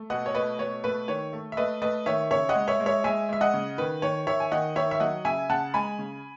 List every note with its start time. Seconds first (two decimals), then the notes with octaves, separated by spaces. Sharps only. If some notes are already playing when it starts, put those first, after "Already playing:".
Already playing: A3
0.10 B2 D#5 F#5
0.26 C#5
0.35 A3 B4 D#5
0.59 B2 C#5
0.84 A3 B4
1.08 D#3 C#5
1.33 A3
1.52 E5
1.57 A3 B4 D#5
1.82 A3 B4 D#5
2.06 D#3 C#5 E5
2.31 C#3 C#5 E5
2.49 D#5 F#5
2.55 G#3
2.68 C#5 E5
2.80 G#3
2.86 C#5 E5
3.04 G#3 E5 G#5
3.29 G#3 E5
3.41 D#5 F#5
3.54 C#3
3.78 D#3 B4
4.02 D#3 C#5
4.27 D#3 C#5 E5
4.40 G#5
4.51 D#3 D#5 F#5
4.76 D#3 C#5 E5
4.91 E5
5.00 F#3 D#5 F#5
5.25 C#3 E5 G#5
5.49 C#3 F#5 A5
5.74 G#3 G#5 B5
5.99 C#3